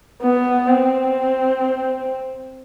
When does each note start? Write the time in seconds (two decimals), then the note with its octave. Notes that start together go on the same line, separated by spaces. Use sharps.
0.22 B3
0.67 C4